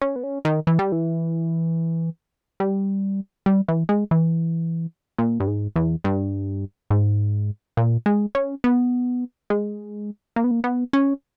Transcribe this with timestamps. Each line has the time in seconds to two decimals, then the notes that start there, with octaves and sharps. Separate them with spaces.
0.01 C#4
0.16 B3
0.24 C#4
0.45 D#3
0.67 E3
0.79 G3
0.92 E3
2.60 G3
3.46 G3
3.68 E3
3.89 G#3
4.11 E3
5.18 A#2
5.40 G2
5.48 G#2
5.76 E2
6.04 G2
6.90 G#2
7.77 A#2
8.06 G#3
8.35 C#4
8.64 B3
9.50 G#3
10.36 A#3
10.44 B3
10.51 A#3
10.64 B3
10.93 C#4